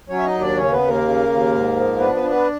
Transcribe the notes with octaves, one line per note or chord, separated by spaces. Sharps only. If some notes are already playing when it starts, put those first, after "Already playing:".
F#3 C#4 C#5
E5
D#4 D#5
D#2
D4 D5
C#3 C#4 C#5
B3 B4
D#2
A#3 A#4
C#3
D#2
G#2
F3
B3 D4 B4
B3 B4
D4
B3 B4